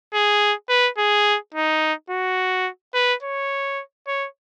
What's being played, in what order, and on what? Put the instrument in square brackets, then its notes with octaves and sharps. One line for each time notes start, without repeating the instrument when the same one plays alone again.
[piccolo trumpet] G#4
B4
G#4
D#4
F#4
B4
C#5
C#5